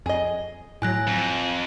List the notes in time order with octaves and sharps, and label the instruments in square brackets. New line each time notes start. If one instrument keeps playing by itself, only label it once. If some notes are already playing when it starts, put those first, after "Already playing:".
[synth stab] F2 [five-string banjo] G#4 D#5
[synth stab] A2 F#3 [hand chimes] G#5 F#6 A#6
[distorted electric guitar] F2